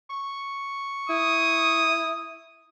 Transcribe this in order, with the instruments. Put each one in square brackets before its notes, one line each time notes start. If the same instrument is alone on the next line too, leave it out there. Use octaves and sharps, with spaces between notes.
[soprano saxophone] C#6
[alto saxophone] E4 [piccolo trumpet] D#6